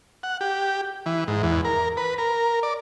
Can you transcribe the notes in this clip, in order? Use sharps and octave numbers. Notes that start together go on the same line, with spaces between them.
F#5
G4
E3
G#2
E2
A#4
B4
A#4
D5